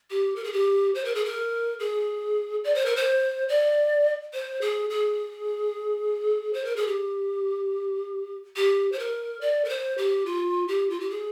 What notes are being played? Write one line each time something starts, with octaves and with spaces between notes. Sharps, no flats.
G4
A#4
G#4
G4
C5
A#4
G#4
A#4
G#4
D5
C5
A#4
C5
D5
C5
G#4
G#4
C5
A#4
G#4
G4
G4
C5
A#4
D5
A#4
C5
G4
F4
G4
F4
G4
G#4